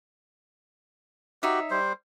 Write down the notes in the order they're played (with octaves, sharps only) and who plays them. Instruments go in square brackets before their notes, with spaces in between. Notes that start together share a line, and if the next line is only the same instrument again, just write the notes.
[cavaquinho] D#4 C#5 E5 [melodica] F#4 G4
[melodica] G3 C5